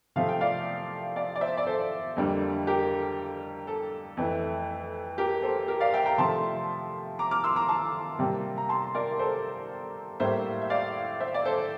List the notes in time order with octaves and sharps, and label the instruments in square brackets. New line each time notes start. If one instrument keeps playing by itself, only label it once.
[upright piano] C3 F3 A3 F5
G5
D5 F5
D5 F5
D5
C5 E5
D5
A4 C5
F2 D3 G3 A#3
G4 A#4
A4
F2 E3 A3
G4 A#4
A4 C5
G4 A#4
D5 F5
E5 G5
G5 A#5
C3 F3 A3 A5 C6
A#5 D6
D6 F6
C6 E6
A#5 D6
A5 C6
C3 G3 A#3
A#5
A5 C6
A#4 D5
A4 C5
A2 G3 A#3 C5 E5
E5
D5 F5
C5 E5
D5
A4 C5